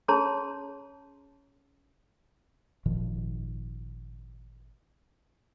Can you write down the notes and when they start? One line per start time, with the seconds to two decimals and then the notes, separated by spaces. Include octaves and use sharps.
0.08 C#4 G#4 C#5 A5 A#5 C6
2.86 G#1 A#2 D#3 F3